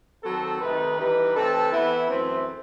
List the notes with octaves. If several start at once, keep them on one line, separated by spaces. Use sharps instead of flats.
D#3 F#3 C4 A4
C3 D#3 A3 D#4 B4
E3 G3 D#4 B4
C3 E3 A3 C4 A4
E3 B3 E4
F#2 E3 A3 C4